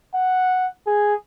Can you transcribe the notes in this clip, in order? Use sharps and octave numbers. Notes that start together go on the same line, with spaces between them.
F#5
G#4